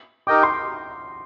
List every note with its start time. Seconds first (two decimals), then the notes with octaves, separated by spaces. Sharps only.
0.27 D#4 G4 A#4 D#5 G5 D6
0.43 C6